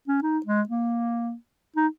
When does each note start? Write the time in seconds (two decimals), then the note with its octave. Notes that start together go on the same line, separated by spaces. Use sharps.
0.08 C#4
0.23 D#4
0.46 G#3
0.69 A#3
1.76 D#4